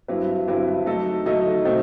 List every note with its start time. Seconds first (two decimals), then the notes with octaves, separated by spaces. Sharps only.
0.08 G2 F#3 C4 E4 B4
0.48 G2 F#3 C4 E4 B4
0.86 F#3 A3 D#4 A4 D#5
1.26 F#3 A3 D#4 A4 D#5
1.65 B2 A3 C4 D#4